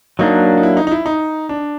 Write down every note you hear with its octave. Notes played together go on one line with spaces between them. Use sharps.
F#3 A#3 D4 D#4
D#4
E4
D#4
D#4
E4
D#4
D4